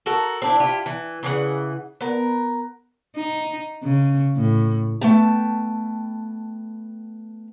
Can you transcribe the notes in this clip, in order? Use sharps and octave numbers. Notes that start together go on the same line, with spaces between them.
F#4 A4 A#4
C4 D4 E4
E4 F4 G4
E3
C#3 E3 G4 F#5
B3 A#4
D#4
C#3
A2
A3 B3 G5 A5